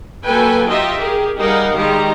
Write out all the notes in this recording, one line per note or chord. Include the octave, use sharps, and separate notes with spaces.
F#3 A#3 A4 B4 G5 G#5
D#4 F4 G4 D#5 E5
G4 G#4 A#4
G3 D#4 G#4 A#4 F5 F#5
D#3 G3 G#3 G4 A#5